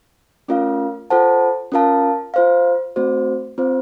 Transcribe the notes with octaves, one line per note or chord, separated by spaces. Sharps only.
A3 C#4 F4 A#4 F5
F4 A4 C5 F#5 A5
C#4 F4 A#4 F5 A5
F4 C5 F5
A3 C4 F#4 C5
C4 F4 C5